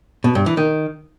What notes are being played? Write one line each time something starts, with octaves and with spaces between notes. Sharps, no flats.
B2
G2
E3
D#3